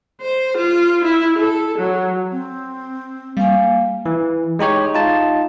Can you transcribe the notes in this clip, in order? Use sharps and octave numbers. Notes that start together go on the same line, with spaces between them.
C5
F4
E4
A4
F#3
C4
G3 A#3 F5 G#5
E3
G#3 D#4 G4 C#5
D#4 F4 A5